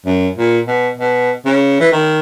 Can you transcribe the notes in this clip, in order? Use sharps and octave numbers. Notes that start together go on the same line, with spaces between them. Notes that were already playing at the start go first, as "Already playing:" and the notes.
F#2
A#2
B2
B2
C#3
E3
D#3